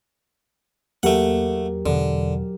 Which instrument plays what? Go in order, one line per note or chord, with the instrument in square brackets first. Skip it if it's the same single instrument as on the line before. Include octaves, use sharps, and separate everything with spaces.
[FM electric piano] E2 A#3 [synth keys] F#3 G4 A#4 [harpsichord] A3 F#5
[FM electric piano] E2 B2 [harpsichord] D3